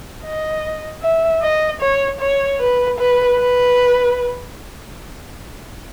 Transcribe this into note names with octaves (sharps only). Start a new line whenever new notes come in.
D#5
E5
D#5
C#5
C#5
B4
B4
B4